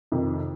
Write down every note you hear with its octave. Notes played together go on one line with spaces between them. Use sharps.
F2 C3 D#3